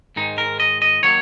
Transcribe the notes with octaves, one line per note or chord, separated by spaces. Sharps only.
G#2 D#3 G#3 D#4
A#4
D#5
D#5
D#3 F#3 A#3 C#5